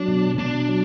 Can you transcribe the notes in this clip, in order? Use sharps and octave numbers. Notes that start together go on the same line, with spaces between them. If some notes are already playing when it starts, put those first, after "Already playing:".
Already playing: F#3 D4
B2
B2 D4
F#3